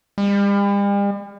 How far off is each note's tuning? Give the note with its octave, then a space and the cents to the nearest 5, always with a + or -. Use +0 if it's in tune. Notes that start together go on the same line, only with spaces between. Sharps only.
G3 +45